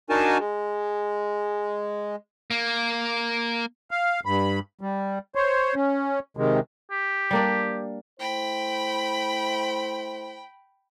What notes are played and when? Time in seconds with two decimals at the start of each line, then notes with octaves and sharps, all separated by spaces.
0.10 D4 D#4 F#4 A#4 G#5 A5
0.39 G#3
2.51 A#3
3.91 F5
4.26 G2 B5
4.81 G3
5.35 C5 C#5
5.75 C#4
6.37 C3 D#3 G#3
6.91 G4
7.31 G3 A#3 D4
8.20 A3 E4 C5 G5 B5